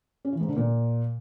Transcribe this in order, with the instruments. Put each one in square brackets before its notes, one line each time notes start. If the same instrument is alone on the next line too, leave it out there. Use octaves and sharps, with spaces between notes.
[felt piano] C#4
E3
G#2
D3
A#2